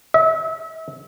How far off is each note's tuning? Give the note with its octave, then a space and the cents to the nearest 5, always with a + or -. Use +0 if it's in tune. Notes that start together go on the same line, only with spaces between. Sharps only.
E5 -35